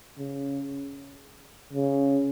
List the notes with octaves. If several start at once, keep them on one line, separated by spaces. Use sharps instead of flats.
C#3
C#3